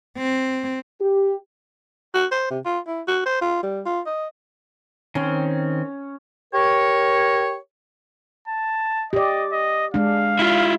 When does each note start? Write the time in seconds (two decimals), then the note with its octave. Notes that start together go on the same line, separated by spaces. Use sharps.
0.18 C4
1.01 G4
2.15 F#4
2.31 C5
2.50 C3
2.65 F4
2.87 E4
3.08 F#4
3.26 C5
3.41 F4
3.63 G3
3.86 F4
4.06 D#5
5.15 D#3 C4 C#4
6.54 G4 A#4 C#5
8.48 A5
9.13 G4 D5 D#5
9.52 D#5
9.94 G#3 D4 F5
10.39 E4 F4